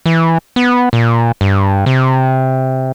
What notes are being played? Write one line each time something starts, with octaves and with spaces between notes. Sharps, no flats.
E3
B3
A#2
G2
C3